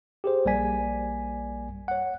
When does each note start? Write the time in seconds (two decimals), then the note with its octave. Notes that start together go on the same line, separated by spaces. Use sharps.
0.24 G4 G#4 C5
0.45 A#1 G3 A#3 D5 G#5 B6
1.88 C#5 F#5